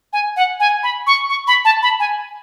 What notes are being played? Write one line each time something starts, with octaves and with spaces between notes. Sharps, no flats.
G#5
F#5
G#5
B5
C#6
C#6
B5
A5
B5
G#5